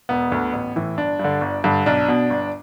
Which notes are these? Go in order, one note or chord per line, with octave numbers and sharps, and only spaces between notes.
E1 B3
D2 D3
A1
A2 E3
G1 D4
G2 D3
G1
G2 D3
B1 D4
B2
G1